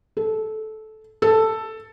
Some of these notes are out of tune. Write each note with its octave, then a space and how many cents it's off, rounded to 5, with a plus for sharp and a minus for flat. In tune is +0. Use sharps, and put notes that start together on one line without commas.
A4 -15
A4 +5